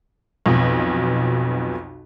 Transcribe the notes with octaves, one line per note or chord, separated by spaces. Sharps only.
B1 F2 B2